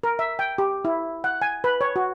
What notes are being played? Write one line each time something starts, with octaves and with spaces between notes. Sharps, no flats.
A#4
E5
G5
G4
E4
F#5
G#5
B4
C#5
F#4